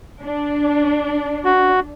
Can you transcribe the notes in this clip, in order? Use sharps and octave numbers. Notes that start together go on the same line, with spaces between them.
D4
F#4